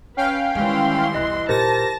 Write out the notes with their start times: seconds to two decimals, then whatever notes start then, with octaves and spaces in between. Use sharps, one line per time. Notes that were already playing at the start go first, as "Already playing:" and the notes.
0.17 C#4 B4 F5 G5
0.55 D#3 E3 G3 G#3 C6
1.14 B1 E2 D#5 F#6
1.49 A#2 F4 G4 A#4 C5 A5 A#6